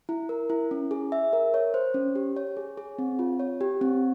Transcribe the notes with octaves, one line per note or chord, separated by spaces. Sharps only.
E4
A#4
E4
C#4
G#4
E5
A#4
C#5
C5
C#4
G4
C#5
G#4
G#4
C4
F4
C#5
G4
C4